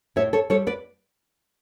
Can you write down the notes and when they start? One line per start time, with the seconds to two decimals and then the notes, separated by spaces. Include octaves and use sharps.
0.16 A2 C#5 E5
0.33 A4 C#5
0.50 G3 A4 C#5
0.67 B4 D5